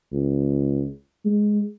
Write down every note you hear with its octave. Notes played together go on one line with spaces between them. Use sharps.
C#2
G#3